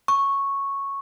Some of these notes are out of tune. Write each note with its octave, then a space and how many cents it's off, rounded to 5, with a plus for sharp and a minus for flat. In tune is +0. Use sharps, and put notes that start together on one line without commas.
C#6 -5